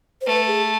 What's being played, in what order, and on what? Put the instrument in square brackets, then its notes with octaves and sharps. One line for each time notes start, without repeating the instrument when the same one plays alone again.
[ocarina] C5
[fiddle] A3 [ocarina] B4
[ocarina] G#4